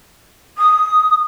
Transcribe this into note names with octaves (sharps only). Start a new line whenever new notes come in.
D#6